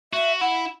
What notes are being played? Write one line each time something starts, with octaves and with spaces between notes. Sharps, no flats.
F#4 E5
E4 F#5